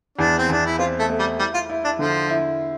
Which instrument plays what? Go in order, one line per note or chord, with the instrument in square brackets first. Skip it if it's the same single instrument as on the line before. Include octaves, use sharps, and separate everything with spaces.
[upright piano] E2 [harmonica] D4
[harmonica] C4
[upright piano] E2 [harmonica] D4
[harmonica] E4
[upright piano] C4 [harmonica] F4
[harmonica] A3
[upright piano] A3
[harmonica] G3
[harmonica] G3 [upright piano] E4
[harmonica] F4
[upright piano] E4
[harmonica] D4
[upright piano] D3 [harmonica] F3
[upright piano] E4